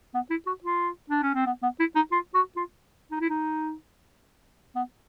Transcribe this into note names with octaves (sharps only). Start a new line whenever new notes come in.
B3
E4
F#4
F4
D4
C#4
C4
B3
B3
E4
D#4
F4
F#4
F4
D#4
E4
D#4
B3